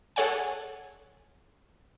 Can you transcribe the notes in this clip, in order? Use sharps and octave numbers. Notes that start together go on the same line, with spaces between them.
G#4 A4 C#5 F#5 G#5